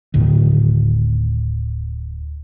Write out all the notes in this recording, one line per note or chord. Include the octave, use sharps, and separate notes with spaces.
D1 D2 A2 D#3